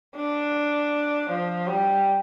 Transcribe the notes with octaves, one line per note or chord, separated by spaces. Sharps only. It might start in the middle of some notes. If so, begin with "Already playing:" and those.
D4
F3
G3